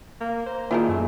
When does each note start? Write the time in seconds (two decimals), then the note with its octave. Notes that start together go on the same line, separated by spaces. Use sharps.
0.20 A#3
0.46 C5 A#5
0.71 A#2 D#3 A#3 E4 F4 G#4 A#4
0.89 F#2 A3